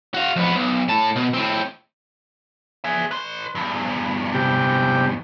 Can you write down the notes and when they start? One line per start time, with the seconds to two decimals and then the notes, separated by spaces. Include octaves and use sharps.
0.14 F#4 F5
0.36 F2 B3
0.55 B1
0.89 A2 A5
1.16 B2
1.34 A2 C4
2.84 G#4 E5
3.11 B4 C6
3.55 E2 G2
4.34 C3 G4